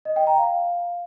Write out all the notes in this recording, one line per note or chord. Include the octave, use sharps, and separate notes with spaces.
D#5
G5
A#5
F5